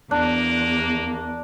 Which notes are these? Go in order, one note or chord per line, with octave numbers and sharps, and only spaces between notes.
E2 A#3 D4